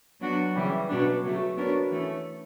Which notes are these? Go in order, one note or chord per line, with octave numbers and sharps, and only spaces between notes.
F#3 B3 D4 F#4
C#3 E3 G3
B2 F#3 B3 D4
C#3 F#3 A3
B3 D4 F#4 A#4 C#5
E3 A3 C#4